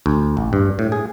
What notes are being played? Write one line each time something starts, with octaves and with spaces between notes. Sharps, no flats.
D2
A1
G2
A2
G#4